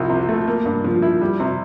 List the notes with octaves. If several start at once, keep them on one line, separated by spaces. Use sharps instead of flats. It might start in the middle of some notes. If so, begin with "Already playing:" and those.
Already playing: C2 F3
C3
A3
A#3
G2
F3
E4
G3
C3